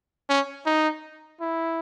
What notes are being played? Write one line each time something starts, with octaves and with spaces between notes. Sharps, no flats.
C#4
D#4
E4